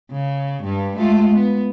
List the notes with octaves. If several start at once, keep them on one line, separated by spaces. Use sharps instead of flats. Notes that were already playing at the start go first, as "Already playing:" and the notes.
C#3
G2 G3
G#3 A3 F4
B3